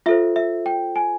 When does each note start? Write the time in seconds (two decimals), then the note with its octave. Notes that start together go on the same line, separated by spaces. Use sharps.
0.06 F4 A4 C5 E5
0.36 E5
0.66 G5
0.96 G#5